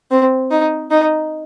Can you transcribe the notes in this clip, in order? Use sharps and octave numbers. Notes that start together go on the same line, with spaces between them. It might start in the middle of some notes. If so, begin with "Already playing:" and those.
C4
D#4
D#4